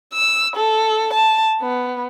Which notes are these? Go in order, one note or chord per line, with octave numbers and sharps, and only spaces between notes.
E6
A4
A5
B3